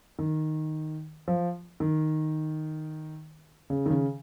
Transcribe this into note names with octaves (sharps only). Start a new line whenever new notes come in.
D#3
F3
D#3
C#3
D#3
C#3